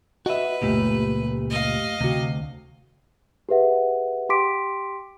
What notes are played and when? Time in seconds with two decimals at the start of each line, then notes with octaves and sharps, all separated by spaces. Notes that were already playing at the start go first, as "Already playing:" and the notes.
0.26 F#4 B4 D#5 E5
0.62 C#2 F#2 A#2 A3 G4
1.50 D#5 F5
2.01 D2 C3 F#4
3.49 G4 G#4 B4 E5 F#5
4.29 G4 G5 C6 D6 B6 D7